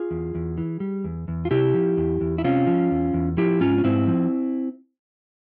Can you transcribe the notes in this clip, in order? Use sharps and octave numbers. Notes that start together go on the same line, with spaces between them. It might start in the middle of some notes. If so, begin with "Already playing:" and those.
Already playing: F4 G#4
E2
E2
E3
G3
E2
E2
F4
C3 E4 G4
F3
E2
E2
E4
C3 C#4 F4
F3
E2
E2
F3 E4 G4
G#2 C#4 F4
C#4
G#2 C4 E4
F3